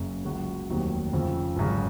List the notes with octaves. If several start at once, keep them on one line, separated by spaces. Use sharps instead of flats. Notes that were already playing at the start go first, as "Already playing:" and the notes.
Already playing: F#1 F#2 C#3
C#2 C#3 F#3 C#4 F#4
F1 D#2 D#3 F#3 C4
F2 C#3 F3 C4
G#1 F#2 C#3